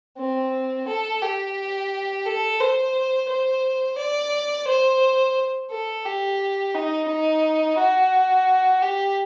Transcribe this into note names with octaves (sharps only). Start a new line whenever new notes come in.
C4
A4
G4
A4
C5
C5
D5
C5
A4
G4
D#4
D#4
F#4
G4